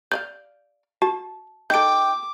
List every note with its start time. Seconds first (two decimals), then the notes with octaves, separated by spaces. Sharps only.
0.12 D5 D#5 F5 G6
1.02 F#4 A5
1.70 D#4 A4 G5 D6 G6 D7